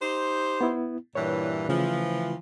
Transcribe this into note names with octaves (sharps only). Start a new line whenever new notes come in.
D#4 G4 C5
B3 E4
G2 A#2 E3 C#5
C#3 E3 F3 A3